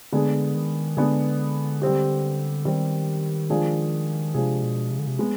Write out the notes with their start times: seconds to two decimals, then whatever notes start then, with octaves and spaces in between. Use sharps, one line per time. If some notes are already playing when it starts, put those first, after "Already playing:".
0.12 D3 G#3 B3 D4 G#4
0.55 D#3
0.97 D3 G#3 B3 D4 G#4
1.82 G3 C4 G4
2.65 D#3 G3 C4 G4
3.50 F3 G#3 D4 G#4
4.34 C3 F3 G#3 D4 G#4
4.63 B2
4.91 C3
4.99 D3
5.07 C3
5.19 G#3 B3